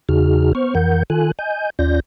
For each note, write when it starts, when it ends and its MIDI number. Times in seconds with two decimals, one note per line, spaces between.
0.09 0.53 40
0.09 0.53 49
0.09 0.53 63
0.09 0.53 66
0.09 0.53 68
0.09 0.53 89
0.55 0.74 59
0.55 0.74 72
0.55 0.74 85
0.55 0.74 89
0.75 1.03 41
0.75 1.03 52
0.75 1.03 70
0.75 1.03 78
0.75 1.03 91
1.10 1.32 51
1.10 1.32 65
1.10 1.32 69
1.10 1.32 80
1.10 1.32 90
1.39 1.70 75
1.39 1.70 80
1.39 1.70 91
1.79 2.00 39
1.79 2.00 61
1.79 2.00 65
1.79 2.00 74
1.79 2.00 91
1.79 2.00 94